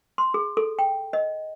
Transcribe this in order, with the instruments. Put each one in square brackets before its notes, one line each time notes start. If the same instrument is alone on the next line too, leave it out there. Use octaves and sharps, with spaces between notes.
[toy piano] C6
G#4
A4
G5
D#5